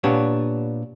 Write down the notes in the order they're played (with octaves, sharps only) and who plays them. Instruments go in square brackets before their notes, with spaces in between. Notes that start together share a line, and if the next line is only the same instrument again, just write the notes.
[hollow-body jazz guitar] A#2 B3 D4 G4 C#5